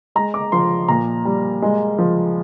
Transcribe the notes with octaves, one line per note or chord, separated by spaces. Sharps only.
G#3 A#5
D6
F3 C6
A#2 A#5
G3
G#3
F3